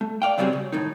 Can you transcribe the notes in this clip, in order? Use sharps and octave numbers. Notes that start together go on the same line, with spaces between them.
A3
D5 F5 G5
C#3 F#3 G3 B3 C4 G#4
C#3
A2 D#3 D#4